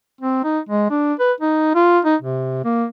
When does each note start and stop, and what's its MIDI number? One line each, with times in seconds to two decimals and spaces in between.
0.21 0.44 60
0.44 0.59 63
0.69 0.86 56
0.90 1.14 62
1.19 1.32 71
1.41 1.70 63
1.75 1.99 65
2.05 2.16 63
2.22 2.60 48
2.64 2.85 58